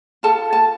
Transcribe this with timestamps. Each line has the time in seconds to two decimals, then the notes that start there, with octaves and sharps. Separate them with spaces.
0.23 F4 A4 A5
0.53 A5